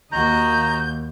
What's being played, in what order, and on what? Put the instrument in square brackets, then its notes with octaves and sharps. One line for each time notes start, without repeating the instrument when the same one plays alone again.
[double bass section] D#2 [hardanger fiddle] F#4 D#5 [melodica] A#5 [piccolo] G6